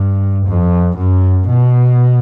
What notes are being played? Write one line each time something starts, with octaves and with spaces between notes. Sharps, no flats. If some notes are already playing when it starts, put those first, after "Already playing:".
Already playing: G2
F2
F#2
B2